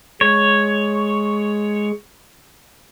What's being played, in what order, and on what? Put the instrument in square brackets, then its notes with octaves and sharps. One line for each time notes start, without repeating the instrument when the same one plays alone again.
[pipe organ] G#3 [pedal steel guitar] C#5